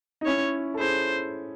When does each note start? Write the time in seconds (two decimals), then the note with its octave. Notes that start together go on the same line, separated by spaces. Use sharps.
0.21 D#4
0.26 C#4 E4 C#5
0.74 A4
0.79 E4 G#4 C5